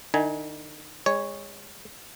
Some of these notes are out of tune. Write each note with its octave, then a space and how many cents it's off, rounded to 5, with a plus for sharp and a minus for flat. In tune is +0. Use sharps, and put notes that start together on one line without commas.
D#3 -45 D#4 +40 G#5 +0
G#3 -30 C#5 +0